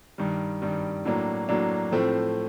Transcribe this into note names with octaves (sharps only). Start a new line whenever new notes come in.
G2 D#3 G3
G2 D#3 G3
A2 F#3 A#3 D4
A2 F#3 A#3 D4
A2 F3 A3 C4